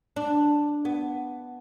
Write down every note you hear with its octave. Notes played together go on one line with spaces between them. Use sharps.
D4
B3